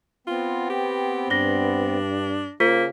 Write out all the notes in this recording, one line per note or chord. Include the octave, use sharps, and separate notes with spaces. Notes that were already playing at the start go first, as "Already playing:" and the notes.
B3 C4 F4
G4
G2 D4 A#6 G7
C#3 A#3 F4 C5 B6